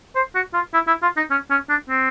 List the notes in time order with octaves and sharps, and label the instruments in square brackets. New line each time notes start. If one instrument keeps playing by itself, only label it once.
[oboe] C5
F#4
F4
E4
E4
F4
D#4
C#4
C#4
D4
C4